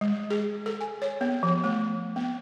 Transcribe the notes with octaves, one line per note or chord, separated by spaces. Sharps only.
G#3
G#4
A4
G#5
C#5
B3
F3
A3
B3